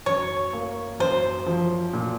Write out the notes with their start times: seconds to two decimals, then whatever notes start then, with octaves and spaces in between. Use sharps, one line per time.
0.06 F#2 C#5
0.53 A#3
1.00 F#2 C5
1.46 F3
1.93 A#2